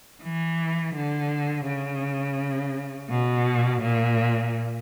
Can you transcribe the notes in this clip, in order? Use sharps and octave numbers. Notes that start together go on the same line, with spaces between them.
E3
D3
C#3
B2
A#2